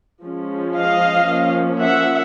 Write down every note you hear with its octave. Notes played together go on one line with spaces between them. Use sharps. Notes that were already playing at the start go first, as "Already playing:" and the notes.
F3 G#3 C#4
D#5 F5
F3 A#3 C#4
E5 F#5